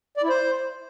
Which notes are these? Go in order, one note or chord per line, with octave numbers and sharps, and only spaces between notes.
D5
E4
C5